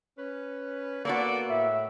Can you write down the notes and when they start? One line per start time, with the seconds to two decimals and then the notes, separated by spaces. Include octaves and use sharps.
0.18 C#4 B4
1.05 A#3 B3 F#4 A4 D5
1.50 A2 E5